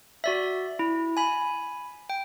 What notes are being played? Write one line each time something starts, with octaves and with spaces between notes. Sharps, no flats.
F#4 D5 E5
E4
G#5 B5
G5